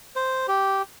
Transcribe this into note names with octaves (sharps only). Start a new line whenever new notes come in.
C5
G4